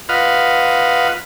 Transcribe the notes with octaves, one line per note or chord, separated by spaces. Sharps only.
F4 B4 D#5 F5 F#5